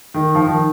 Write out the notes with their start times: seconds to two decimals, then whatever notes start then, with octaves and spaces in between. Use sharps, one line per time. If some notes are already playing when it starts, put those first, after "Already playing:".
0.14 D#3
0.35 F3
0.46 D#3